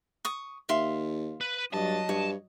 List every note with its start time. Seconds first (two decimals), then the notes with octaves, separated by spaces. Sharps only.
0.25 C#6 D#6
0.69 D#2 E5 F5 C6
1.41 B4
1.73 G2 F#3 D#5 A5
2.09 G2 C#5